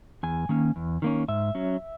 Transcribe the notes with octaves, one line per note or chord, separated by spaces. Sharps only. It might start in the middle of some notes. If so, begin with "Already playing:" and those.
E2 G#5
D#3 A#3 C#4
E2
D#3 A#3 C#4
G#2 E5
F#3 C#4